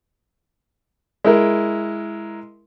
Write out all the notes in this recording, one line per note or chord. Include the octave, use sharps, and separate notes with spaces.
G#3 E4 A#4